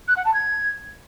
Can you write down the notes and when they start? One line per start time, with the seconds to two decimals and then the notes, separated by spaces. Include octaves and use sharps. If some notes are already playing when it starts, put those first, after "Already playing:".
0.08 F#6
0.17 F#5
0.25 A5
0.34 G#6